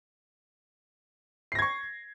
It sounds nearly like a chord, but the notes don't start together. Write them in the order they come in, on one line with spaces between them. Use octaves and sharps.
C7 A#6 G#6 C#6